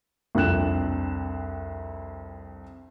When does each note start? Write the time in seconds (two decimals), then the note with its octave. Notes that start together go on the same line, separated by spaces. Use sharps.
0.35 C2 F2 D4 F#6 E7